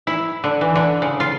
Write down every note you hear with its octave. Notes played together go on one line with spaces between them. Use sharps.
E4
D3
E3
D3
C#3
F4